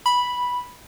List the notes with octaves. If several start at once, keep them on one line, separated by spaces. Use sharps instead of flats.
B5